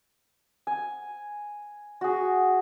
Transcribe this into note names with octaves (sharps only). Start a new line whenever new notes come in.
G#5
F#4 G#4